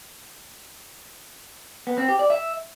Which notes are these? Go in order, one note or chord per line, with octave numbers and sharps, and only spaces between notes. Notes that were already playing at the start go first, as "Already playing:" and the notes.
B3
C4
G4
D5
E5